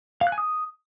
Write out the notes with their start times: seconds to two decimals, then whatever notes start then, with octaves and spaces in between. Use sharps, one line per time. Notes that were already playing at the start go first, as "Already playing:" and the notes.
0.21 F5
0.27 F#6
0.32 G#5
0.38 D#6